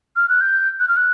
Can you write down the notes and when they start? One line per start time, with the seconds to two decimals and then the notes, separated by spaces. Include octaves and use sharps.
0.16 F6
0.29 F#6
0.41 G6
0.80 F#6
0.88 F6
0.96 F#6